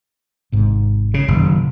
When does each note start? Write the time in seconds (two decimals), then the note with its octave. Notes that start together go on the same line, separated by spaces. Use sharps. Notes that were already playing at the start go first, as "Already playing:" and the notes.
0.52 G#1 G#2 C3
1.14 C#3
1.28 F#1 F#2 B2 D#3